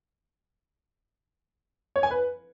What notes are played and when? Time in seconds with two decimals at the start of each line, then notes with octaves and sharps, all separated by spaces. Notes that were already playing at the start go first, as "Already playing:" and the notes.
1.96 C#5
2.03 G#5
2.11 B4